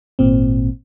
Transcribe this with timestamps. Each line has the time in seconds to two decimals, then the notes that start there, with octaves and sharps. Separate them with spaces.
0.19 G#1 A#2 C4